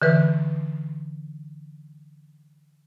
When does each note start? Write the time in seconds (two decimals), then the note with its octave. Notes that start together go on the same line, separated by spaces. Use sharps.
0.02 D3 E3 B4